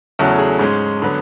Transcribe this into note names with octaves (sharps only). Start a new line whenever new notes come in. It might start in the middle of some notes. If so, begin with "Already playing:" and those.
E2 C#3 F#3 A3 F#4 A4
G#4
G#2 G#3 C#4
D3 F#3 B3